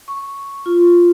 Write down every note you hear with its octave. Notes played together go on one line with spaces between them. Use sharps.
C#6
F4